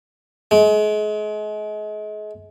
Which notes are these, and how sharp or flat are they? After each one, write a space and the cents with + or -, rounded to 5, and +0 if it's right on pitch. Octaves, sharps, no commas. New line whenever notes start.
G#3 +35